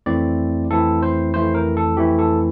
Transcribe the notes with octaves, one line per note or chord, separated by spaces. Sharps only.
F2 E3 A3 C4 E4 D5
F2 E3 A3 C4 E4 A4
C5
F2 E3 A3 C4 E4 C5
A#4
A4
F2 E3 A3 C4 E4 G4
A4